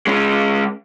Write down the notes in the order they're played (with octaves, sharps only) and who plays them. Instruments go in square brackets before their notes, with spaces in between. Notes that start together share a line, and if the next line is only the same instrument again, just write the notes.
[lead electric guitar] G#3 C#4